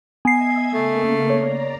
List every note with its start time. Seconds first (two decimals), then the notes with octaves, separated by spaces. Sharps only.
0.25 B3 D#5 E5 G#5 G#6 C7
0.74 C#3 A3 A#3
1.30 C#5 D5 A#5